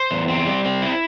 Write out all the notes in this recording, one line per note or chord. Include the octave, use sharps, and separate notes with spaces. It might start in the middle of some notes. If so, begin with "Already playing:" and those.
Already playing: C5
E2
C4
G3
C4
E4